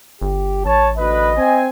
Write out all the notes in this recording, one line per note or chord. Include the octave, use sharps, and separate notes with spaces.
G1 G4
A1 C#5 A5
D2 B4 D#5
C4 G#5